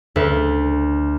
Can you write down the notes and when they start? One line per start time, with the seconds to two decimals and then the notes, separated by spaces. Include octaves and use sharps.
0.16 D2 B4